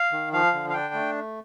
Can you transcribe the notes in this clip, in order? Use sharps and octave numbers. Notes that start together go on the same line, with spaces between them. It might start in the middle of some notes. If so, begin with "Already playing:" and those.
Already playing: F5
D#3
F3 F5
D3
F5
D4 G5
A3